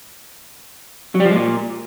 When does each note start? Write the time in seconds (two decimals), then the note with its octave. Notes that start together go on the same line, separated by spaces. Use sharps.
1.15 F#3
1.20 G3
1.25 F3
1.31 G#3
1.36 A#2